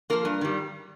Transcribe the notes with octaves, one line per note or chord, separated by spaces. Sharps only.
F3 A#3 A#4
G2
D#3 G3